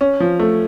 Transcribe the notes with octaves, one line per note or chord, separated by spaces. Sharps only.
C#4
F3
A3